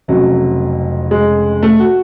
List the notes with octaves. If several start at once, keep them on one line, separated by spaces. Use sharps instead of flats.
F1 F2 C#3 F#3
G#3
A3
F#4